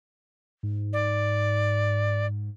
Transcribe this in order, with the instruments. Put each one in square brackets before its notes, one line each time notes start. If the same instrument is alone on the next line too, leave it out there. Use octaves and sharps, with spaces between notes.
[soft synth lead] G#2
[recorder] D5